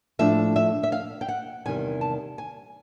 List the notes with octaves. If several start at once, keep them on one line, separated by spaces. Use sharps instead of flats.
A2 F3 A3 D4 E5
E5
E5
F5
G5
F#5
E2 C3 D#3 G3 G#5
A5
G#5